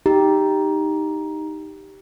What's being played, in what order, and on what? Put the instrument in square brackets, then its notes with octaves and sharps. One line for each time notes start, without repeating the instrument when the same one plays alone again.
[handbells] D#4 [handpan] G4